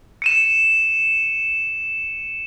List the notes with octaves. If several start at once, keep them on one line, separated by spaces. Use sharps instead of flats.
C#7 D#7 E7